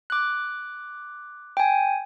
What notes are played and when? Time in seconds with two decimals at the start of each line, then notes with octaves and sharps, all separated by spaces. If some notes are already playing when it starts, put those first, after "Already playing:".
0.10 D6 F#6
1.57 G5 G#5